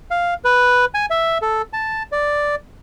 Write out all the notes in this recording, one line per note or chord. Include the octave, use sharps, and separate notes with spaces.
F5
B4
G#5
E5
A4
A5
D5